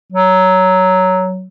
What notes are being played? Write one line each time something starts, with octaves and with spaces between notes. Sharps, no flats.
F#3